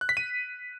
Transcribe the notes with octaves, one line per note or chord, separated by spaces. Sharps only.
F#6
B6
D#7